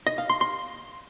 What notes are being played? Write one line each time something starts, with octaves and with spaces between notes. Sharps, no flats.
D#5
F5
C6
C6